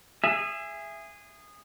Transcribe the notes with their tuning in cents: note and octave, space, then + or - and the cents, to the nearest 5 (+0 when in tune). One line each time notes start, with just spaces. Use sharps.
G#4 -15 E5 +15